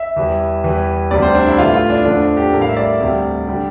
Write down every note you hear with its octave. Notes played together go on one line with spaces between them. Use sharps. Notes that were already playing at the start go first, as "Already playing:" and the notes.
Already playing: E5
E2 E3 G3
E2 E3 G3
D2 C3 G3 D5
C5
D4
E4
A2 E3 A3 F4
F4
D4
E2 D3 F3 A3 D4
G4
A2 G3 A#4
F5
E5
D5
D2 C3 G3
D3 G3